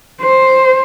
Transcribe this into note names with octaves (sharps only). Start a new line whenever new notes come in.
C5